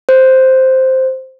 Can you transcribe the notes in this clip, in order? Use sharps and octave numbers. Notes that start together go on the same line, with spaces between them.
C5